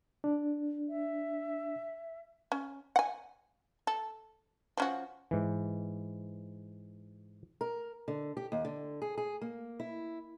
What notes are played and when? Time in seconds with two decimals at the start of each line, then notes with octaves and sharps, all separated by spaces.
0.24 D4
0.88 E5
2.52 C#4
2.96 F#5 G#5
3.87 A4
4.77 F3 C#4 F#4
5.31 G#2 E3
7.61 A#4
8.08 D3
8.37 G4
8.52 D#2
8.65 D3
9.02 G#4
9.18 G#4
9.41 A#3
9.80 E4